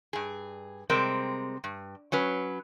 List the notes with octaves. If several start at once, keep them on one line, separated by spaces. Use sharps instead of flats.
G2 G#4
C3 G3 G#3 C4 A#4
G2
F#3 C#4 B4